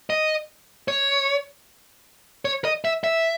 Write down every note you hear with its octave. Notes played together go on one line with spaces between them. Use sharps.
D#5
C#5
C#5
D#5
E5
E5